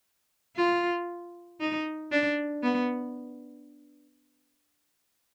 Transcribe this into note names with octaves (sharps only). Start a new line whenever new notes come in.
F4
D#4
D4
B3